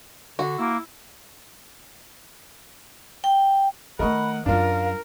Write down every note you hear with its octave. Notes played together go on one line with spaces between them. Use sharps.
D3 F#4
A#3 E4
G5
D#3 A3 A#4 D#5 F#5 B5 C#6
F#2 F#3 D4 F4 A#4 F5